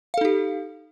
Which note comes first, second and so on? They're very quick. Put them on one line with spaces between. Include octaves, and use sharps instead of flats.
F5 A4 D#4 G4